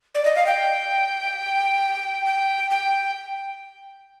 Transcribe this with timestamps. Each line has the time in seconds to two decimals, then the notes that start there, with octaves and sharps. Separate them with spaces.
0.15 D5
0.25 D#5
0.36 F5
0.47 G5
2.26 G5
2.71 G5